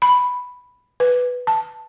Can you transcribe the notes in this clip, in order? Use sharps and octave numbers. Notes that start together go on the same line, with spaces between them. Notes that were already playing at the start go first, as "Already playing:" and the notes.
B5
B4
A5